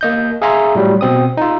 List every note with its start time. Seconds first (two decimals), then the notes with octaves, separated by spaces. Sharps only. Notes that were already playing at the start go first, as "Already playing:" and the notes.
0.01 A#3 D#5 G6
0.42 G#4 E5 F5 G#5 A#5 C6
0.75 A2 F#3 G3
1.01 B2 C4 D#6
1.37 D#4 F4